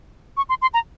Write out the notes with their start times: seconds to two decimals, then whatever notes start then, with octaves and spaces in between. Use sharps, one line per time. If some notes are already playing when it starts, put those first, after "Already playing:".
0.37 C#6
0.49 C6
0.62 C6
0.74 A#5